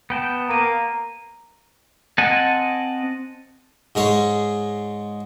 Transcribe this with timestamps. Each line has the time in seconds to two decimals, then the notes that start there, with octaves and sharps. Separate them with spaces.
0.10 B3 G5 A5
0.49 A#3 A#5 D#7
2.18 C4 D#5 F#5 G#5 A5
3.95 G#2 G#3 C#5